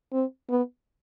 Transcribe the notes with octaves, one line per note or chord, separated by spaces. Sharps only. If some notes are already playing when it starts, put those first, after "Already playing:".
C4
B3